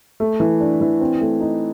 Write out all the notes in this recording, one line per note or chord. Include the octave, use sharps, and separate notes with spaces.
A3
E3
D4
E3
C4
A3
D#4